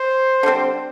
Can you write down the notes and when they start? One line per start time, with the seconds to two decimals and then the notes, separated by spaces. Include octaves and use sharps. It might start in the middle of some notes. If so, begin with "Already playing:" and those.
Already playing: C5
0.43 D3 G3 C4